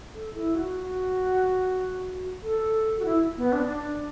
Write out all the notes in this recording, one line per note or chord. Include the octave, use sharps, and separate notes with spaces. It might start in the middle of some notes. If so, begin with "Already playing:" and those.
A4
E4
F#4
A4
F#4
E4
B3
D4
D4